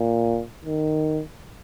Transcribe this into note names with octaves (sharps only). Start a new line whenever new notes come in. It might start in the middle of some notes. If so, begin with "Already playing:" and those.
Already playing: A#2
D#3